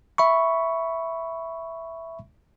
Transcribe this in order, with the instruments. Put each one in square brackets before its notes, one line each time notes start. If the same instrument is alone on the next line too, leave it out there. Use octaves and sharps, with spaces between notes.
[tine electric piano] E5 B5 C#6